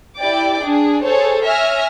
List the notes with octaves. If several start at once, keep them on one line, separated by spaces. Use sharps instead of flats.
E4 G4 D5 G5 D6
D4 G#4
G#4 A4 C5 C#5
C#5 E5 G#5 F6 A#6